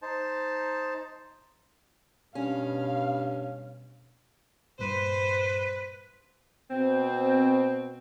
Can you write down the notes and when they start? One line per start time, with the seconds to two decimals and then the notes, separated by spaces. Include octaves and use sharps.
0.02 D#4 C5 A5
2.35 G2 B2 C#4 F5
4.79 G2 A#2 B4 C5
6.71 B2 C4